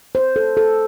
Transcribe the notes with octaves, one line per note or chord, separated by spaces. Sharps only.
C5
A4
A4